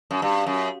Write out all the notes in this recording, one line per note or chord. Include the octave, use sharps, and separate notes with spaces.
F#2
G2
F#2